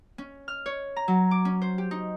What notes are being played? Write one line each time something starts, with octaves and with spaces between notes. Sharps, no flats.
C#4
F6
C#5
A#5
F#3
D6
C#4
C5
G4
D#4